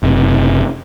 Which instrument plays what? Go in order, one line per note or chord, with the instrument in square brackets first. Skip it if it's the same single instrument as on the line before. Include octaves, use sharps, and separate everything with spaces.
[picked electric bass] F#1 C3